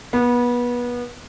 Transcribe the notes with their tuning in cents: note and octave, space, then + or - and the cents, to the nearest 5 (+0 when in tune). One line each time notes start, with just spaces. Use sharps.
B3 -25